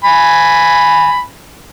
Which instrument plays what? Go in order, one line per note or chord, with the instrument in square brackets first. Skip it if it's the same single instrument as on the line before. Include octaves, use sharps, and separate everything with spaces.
[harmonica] G#5 B5